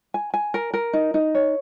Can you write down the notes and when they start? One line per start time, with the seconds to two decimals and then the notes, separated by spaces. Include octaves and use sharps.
0.14 G#5
0.34 G#5
0.54 A#4
0.74 A#4
0.93 D#4
1.14 D#4
1.35 C#5